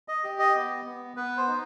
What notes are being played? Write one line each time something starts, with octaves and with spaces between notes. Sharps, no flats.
D#5
G4
D#5
B3
B3
B3 B4
C5
D#4